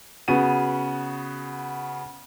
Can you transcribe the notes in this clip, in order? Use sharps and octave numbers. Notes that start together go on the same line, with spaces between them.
C#3 B3 F#4 D#7